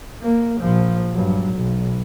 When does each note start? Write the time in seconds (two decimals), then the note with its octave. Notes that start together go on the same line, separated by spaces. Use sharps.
0.22 A#3
0.61 A#1 F3
1.13 G2 F#3
1.54 B1